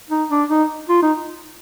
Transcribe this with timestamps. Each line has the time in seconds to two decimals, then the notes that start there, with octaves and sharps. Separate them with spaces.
0.10 D#4
0.30 D4
0.49 D#4
0.89 F4
1.02 D#4